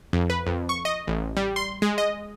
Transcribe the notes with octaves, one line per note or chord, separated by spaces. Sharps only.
F2
B4
F2
C#6
D#5
A1
G3
C6
G#3
D#5